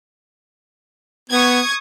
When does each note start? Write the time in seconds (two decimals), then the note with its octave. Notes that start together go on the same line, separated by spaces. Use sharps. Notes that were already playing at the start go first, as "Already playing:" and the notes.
1.30 B3 C#6 D#6 G#6